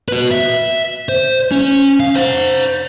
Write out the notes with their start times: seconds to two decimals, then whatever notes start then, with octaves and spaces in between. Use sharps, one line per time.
0.08 F#4 B4
0.31 E5
1.09 C5
1.52 C#4
2.00 F5
2.16 C5 F#5